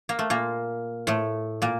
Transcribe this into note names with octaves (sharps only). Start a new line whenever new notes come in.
A#3
A3
A#2 A#3
A2 A3
A#2 A#3